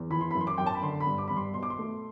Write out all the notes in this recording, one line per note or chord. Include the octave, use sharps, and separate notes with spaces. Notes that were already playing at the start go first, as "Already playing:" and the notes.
Already playing: E2
E3 B5
C6
F#2 B5
C6
D6
F#2 G5
A5
B5
D3 C6
B5
G2
D6
G2 B5
C6
B2 C6
D6
C6
A3